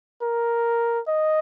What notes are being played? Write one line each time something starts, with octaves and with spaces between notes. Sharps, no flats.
A#4
D#5